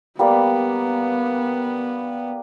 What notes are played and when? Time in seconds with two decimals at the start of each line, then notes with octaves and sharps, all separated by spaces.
0.19 G3 A#3 B3 D5